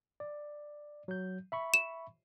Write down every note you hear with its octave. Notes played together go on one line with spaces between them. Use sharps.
D5
F#3 G6
E5 B5 C#6
E7